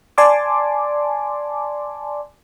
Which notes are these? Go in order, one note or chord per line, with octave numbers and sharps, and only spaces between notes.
D5 G#5 A5 C6 D6